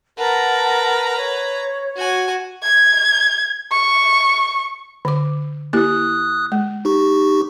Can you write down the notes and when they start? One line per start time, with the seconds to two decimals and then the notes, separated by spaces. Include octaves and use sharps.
0.17 A#4 B4 F#5 A5 A#5
1.17 C#5
1.96 F#4 G#5
2.63 G#6
3.71 C#6
5.05 D3 D6
5.73 A#3 E4 G4 D#6 F#6
6.52 G#3
6.85 D#4 G4 C#6